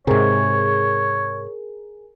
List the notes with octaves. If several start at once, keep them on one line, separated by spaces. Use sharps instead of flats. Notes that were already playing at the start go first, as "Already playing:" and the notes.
G#2 C3 G#4 A#4 C#5